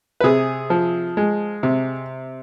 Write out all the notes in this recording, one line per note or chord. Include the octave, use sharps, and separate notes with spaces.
B4
C3 G#4
F3
G#3
C3